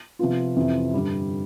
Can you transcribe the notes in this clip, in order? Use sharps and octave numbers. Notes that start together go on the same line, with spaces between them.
C3 F3 B3 F4
F2 C3 E3
G2 D3 G3